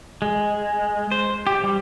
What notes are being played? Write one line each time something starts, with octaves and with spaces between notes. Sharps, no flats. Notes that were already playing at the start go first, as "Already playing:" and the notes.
G#3
C5
G4
G3